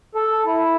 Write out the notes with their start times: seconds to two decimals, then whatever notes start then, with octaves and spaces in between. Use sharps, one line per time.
0.15 A4
0.46 E4